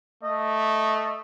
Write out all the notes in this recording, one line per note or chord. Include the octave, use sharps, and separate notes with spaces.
A3 D#5